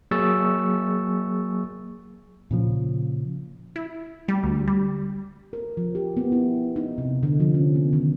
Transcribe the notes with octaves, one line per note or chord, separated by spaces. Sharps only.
F#3 A#3 G#4 C#6 E6 A6
A#2 C#3 F3
E4
G3
D2
G3
A#4
F3
G4
B3
E4
D#4
C3
D3
F3
C#4
B3
D#3